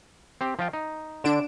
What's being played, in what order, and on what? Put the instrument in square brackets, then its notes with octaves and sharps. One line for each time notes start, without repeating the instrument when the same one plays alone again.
[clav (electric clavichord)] C4 G4
F3 F4 G5
D#4
[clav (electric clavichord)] D3 [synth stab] D4 D7 E7